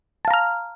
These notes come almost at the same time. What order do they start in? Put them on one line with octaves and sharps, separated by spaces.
A5 F5 A#5 F6